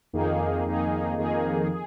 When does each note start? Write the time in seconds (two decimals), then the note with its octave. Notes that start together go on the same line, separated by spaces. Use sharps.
0.13 F2 D#3 A#3 D#4 G#4
0.66 F2 D#3 A#3 D#4 G#4
1.18 F2 D#3 A#3 D#4 G#4
1.71 G#4